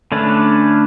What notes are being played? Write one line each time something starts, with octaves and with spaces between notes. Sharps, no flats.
D3 A3 C#4 D4 B4